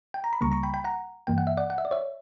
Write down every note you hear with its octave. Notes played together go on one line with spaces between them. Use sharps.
G5
A#5
B5
C#2 C#3 G3 A#3 A#5 C#6
A#5 C#6
G5 B5
G5 B5
F#5 A#5
G2 E3 A#3 G5
F#5
E5
D5 F#5
F#5
E5
D5
C#5 E5